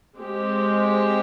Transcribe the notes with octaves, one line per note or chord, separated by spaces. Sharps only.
G#3 C4 G4